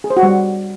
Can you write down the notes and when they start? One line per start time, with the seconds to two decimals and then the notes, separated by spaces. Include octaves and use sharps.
0.04 G#4
0.10 C5
0.17 F#4
0.23 G3